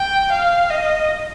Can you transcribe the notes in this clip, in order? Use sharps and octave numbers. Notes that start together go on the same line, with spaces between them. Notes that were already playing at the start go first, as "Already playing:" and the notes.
Already playing: G5
F5
D#5